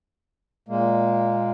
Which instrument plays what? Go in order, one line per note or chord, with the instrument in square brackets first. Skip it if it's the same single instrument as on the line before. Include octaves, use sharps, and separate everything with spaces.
[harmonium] A#2 G#3 A#3